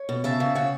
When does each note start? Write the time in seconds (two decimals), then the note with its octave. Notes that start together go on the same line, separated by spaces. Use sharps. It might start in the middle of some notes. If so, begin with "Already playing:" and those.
Already playing: C#5
0.09 B2
0.24 C#3 E5 A5
0.40 C#3
0.55 C#3 C#5 F#5